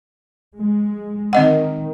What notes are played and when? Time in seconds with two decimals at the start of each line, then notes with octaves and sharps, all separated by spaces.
0.58 G#3
1.33 D#3 C4 D#5 F#5